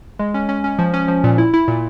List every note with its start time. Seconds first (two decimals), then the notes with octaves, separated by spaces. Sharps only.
0.19 G#3
0.34 C#4
0.49 C#4
0.64 C#4
0.79 F3
0.94 C#4
1.08 F3
1.24 A#2
1.38 E4
1.54 E4
1.68 A#2